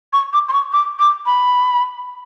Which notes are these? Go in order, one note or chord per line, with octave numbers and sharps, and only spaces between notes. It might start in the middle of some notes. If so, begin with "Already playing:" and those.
C#6
D6
C6
C#6
D6
D6
B5